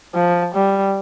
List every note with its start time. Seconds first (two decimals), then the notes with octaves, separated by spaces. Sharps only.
0.15 F3
0.55 G3